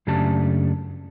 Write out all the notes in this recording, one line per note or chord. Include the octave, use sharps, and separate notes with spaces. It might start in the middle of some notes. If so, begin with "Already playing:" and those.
F#2 C#3 A3 D4 G4 A5